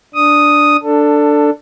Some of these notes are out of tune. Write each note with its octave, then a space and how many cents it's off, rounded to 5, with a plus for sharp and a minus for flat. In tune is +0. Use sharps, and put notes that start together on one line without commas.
D4 +0 D#6 +0
D4 +0 A4 +15